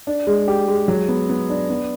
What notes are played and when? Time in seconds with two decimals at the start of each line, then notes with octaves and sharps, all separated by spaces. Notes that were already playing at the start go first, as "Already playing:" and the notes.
0.07 D4
0.27 G#3
0.48 G4
0.68 G#3
0.88 F#3
1.08 B3
1.29 B3
1.50 D4
1.70 B3